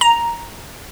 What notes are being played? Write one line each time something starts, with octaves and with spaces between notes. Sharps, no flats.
A#5